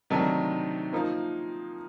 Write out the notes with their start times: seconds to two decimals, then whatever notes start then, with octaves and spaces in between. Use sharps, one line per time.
0.10 C3 D#3 F#3 A3 D4
0.93 F3 A#3 D#4